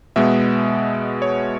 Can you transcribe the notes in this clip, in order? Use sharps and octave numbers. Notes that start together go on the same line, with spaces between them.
B2 G#3 B3 E5
C#5